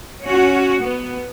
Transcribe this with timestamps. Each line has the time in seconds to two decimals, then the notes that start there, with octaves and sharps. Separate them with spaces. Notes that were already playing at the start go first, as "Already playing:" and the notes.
0.23 C#4 F#4
0.81 B3